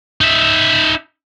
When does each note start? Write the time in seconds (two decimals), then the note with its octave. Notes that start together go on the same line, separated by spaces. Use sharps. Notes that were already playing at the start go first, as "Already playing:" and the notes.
0.21 D#4 E5